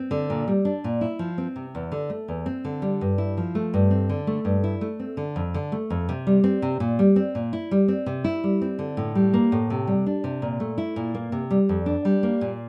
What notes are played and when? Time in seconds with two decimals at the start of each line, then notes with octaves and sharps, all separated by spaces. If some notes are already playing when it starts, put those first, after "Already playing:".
Already playing: C4
0.11 D3
0.30 A#2
0.48 G3
0.65 D4
0.84 A#2
1.01 E4
1.19 F3
1.38 C4
1.56 C3
1.75 E2
1.92 D3
2.10 A3
2.28 E2
2.46 C4
2.65 D3
2.82 G3
3.01 G2
3.18 E4
3.37 F3
3.55 A3
3.74 G2
3.91 C4
4.09 D3
4.27 A3
4.45 G2
4.64 E4
4.81 A3
4.99 C4
5.17 D3
5.36 F2
5.54 D3
5.72 A3
5.90 F2
6.09 C3
6.27 G3
6.44 C4
6.62 C3
6.80 A#2
6.99 G3
7.16 C4
7.35 A#2
7.53 E4
7.71 G3
7.88 C4
8.06 C3
8.24 E4
8.44 G3
8.62 C4
8.79 D3
8.97 A2
9.15 G3
9.33 A#3
9.52 A2
9.70 C3
9.87 G3
10.06 D4
10.24 C3
10.42 A#2
10.60 A3
10.78 E4
10.96 A#2
11.14 A#3
11.32 C3
11.51 G3
11.69 F2
11.86 D4
12.05 G3
12.23 A#3
12.41 A#2